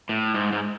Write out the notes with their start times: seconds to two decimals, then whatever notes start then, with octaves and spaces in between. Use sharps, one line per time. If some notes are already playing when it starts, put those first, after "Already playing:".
0.09 A2
0.34 G#2
0.53 G#2